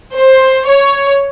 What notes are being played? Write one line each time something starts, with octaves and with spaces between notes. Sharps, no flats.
C5
C#5